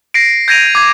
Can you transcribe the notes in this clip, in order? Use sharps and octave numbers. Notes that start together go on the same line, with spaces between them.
A#6 C7 D7
G6 G#6 A#6 D7 D#7 F7
D6 G#6